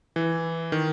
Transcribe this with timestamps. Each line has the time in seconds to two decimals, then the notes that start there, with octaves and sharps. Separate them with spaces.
0.16 E3
0.72 D#3